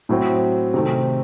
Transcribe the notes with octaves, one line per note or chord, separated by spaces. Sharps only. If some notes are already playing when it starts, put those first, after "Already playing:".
A2 F#3 C4
C3 D#3 A3 C4